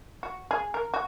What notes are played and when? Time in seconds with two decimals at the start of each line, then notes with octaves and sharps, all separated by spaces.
0.23 F#4
0.51 G#4
0.74 A#4
0.94 F#4